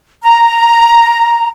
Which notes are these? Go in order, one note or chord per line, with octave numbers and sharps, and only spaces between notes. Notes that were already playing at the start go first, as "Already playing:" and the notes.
A#5